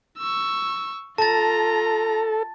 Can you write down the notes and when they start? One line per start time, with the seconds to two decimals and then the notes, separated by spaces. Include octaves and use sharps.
0.17 C#6 E6
1.18 F4 A4 A5 A#5 A6